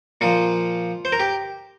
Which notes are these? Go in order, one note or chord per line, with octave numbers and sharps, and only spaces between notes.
A#2 F3 F4
C5
A#4
G4